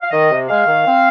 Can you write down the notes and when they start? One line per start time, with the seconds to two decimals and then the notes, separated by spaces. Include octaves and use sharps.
0.02 F5
0.11 D#3 D#5
0.31 C3
0.49 G#3 F5
0.66 D#3
0.85 C4